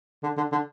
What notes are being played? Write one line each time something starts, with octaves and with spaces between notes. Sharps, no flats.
D3
D3
D3